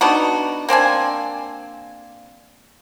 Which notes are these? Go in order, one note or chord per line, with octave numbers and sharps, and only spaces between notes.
B3 D4 D#4 F#4
A#3 C4 D4 G#5